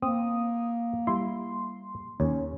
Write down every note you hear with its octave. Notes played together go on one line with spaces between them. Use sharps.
A#3 C4 D#6
G3 E4 C6
D#2 C#4 C#5